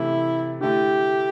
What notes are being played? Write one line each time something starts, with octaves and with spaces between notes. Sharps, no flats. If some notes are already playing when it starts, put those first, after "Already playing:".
Already playing: C3 E3 A3 E4
D3 A3 E4 G4